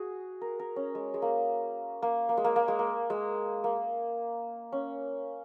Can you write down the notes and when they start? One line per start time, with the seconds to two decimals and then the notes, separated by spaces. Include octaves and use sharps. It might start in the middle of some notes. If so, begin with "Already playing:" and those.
Already playing: F#4 G#4
0.41 A#4
0.59 A#4
0.76 C#4
0.95 G#3
1.14 G#3
1.22 A#3
2.02 A#3
2.29 A#3
2.37 G#3
2.45 A#3
2.56 A#3
2.68 G#3
2.79 A#3
3.10 G#3
3.64 A#3
4.72 C#4